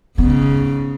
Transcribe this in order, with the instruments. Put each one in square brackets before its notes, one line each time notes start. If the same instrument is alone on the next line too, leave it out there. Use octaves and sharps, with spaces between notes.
[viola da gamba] G#2 C#3 [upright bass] B3